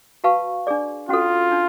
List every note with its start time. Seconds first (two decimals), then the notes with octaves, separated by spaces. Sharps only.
0.24 F#4 B4 F5 A5 C#6
0.67 D4 G#4 D5
1.09 C#4 F4 F#4 A4
1.51 D4